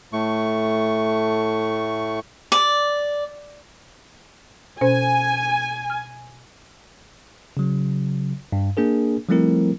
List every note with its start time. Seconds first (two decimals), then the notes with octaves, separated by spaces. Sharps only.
0.13 A2 A3 C#6
2.52 D5
4.81 B2 C#4 C5 G#5
5.90 F6
7.57 C#3 F#3
8.52 G2
8.77 A#3 D4 G#4 A#4
9.29 F3 G3 A3 C4 E4 A#4